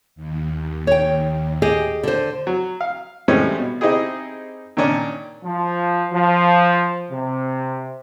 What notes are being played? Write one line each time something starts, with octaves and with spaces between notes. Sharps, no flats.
D#2
C#5 G5
G4 G#4 D#5
D3 C5
F#3
F5
A2 E3 G3 G#3 C4 C#4
B2
C4 D#4 E4 G4 G#4
A#2 D#3 C#4 D4
F3
F3
C3